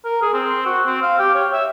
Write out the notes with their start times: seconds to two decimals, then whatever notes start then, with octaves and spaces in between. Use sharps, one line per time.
0.05 A#4
0.22 G#4
0.34 C4
0.66 F#4
0.86 C4
1.02 F5
1.19 G4
1.34 C#5
1.53 E5